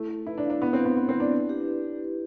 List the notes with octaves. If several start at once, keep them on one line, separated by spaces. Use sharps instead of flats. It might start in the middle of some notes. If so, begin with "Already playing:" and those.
Already playing: A3 E4
A4
E4 B4
D4
F5
D4
B3 E4
C4
B4
B3
B3 E4
C4
B4
D4
E4
G4